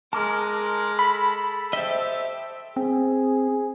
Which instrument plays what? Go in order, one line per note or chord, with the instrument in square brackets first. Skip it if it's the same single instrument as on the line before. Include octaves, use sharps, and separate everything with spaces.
[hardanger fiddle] G#3 [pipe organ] A#4 [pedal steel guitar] A5 D6 F6
[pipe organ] A4 [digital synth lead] B5
[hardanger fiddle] G4 [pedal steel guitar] C5 D#5 [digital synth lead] E5
[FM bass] C4 [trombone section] G#4